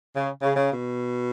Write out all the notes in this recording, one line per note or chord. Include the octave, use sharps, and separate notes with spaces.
C#3
C#3
C#3
B2